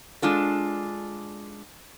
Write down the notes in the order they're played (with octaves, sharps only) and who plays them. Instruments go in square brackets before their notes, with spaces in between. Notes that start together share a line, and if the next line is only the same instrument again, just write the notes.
[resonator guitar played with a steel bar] G#3 D4 F4 A4